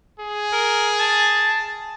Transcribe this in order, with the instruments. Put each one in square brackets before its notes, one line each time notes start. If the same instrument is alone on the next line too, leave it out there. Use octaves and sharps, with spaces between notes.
[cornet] G#4
[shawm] A#4
A5